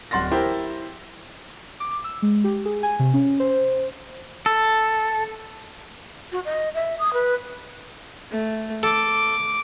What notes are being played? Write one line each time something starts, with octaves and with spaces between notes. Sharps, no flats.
D1 F#5 C6 A6 A#6
E4 G4 A#4 C5
D6
E6
G#3
G4
G#4
G#5
C3
C#4
C5
A4
F#4
D#5
E5
D#6
B4
A3
A4 D6